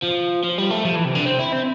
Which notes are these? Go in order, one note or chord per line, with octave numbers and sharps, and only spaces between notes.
F3
F3
G3
A3
F3
E3
C3
D3
C4
E4
C4